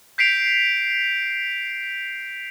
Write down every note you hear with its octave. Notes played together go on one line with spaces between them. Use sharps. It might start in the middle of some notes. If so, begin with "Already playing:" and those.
G6 B6 C7 D7 F7